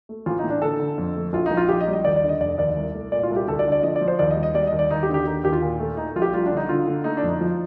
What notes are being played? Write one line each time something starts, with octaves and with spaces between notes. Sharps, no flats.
A3
A1 F4
D#4
A2
D4
D3 A4
D3
F2
A3
A#1 F4
A#1 D#4
F4
A#1 G4
D#5
G3
D#5
D#2 D5
D5
D3
D#5
F1 D5
D#2 D5
C2
A3
A#2 D5
F4
C2
G4
D2 A4
D5
D3
D5
F3 D#5
D5
F3
C5
D#2 D5
D#5
G3
D#5
G3 D5
D#2 D#5
D5
D#2 D#4
G4
D3
G4
D#2 D#4
D#2 G4
F4
A#2
A3
A3 D#4
A#1 F4
G4
G3 F4
D4
D3
D#4
D3 F4
D3
A3 D#4
D4
F2
D#4
F3